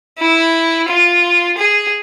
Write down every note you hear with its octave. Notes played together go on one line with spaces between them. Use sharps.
E4
F4
G#4